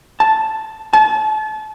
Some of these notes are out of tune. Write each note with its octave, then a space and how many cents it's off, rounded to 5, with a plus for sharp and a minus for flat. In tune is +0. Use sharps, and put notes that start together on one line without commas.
A5 -5
A5 -35